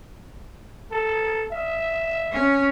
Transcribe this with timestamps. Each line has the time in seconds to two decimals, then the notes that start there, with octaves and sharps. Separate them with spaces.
0.91 A4
1.51 E5
2.32 C#4